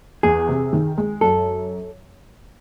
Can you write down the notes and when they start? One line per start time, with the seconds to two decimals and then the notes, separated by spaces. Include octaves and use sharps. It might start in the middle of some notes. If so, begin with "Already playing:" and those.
0.23 E2 G#4
0.49 C3
0.73 D#3
0.98 G#3
1.21 F#2 A4